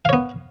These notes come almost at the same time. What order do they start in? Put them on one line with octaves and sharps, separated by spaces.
F5 C#5 B3